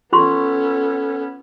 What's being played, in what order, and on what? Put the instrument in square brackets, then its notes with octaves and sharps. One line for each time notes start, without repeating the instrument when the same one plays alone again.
[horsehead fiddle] B3 C#4 [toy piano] F4 C6 C#6 [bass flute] A4